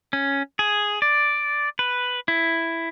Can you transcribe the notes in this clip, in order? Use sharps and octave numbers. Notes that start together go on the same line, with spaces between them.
C#4
G#4
D5
B4
E4